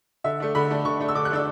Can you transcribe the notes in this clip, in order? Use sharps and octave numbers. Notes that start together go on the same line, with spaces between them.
D3 E5
A3 D4
D3 B5
A3 D4
D3 C#6
A3 D4
E6
D3 D6
F#6
A3 D4 E6